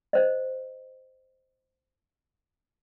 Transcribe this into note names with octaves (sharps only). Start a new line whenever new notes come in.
C5 D#5